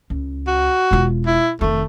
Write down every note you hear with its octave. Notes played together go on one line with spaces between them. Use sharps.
C#2
F#4
E1 F4
E4
F1 D#3 A3